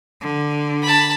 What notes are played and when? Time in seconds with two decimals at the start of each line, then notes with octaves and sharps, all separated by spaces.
0.21 D3
0.83 A5 B5